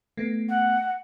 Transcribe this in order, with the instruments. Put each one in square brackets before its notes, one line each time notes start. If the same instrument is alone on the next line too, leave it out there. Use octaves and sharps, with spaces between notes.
[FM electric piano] A3 B3
[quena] F#5